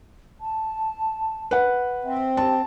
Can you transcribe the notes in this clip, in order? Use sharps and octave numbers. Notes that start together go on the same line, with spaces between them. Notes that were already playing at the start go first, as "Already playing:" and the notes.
A5
B4 F#5
C4 E5
G4 A5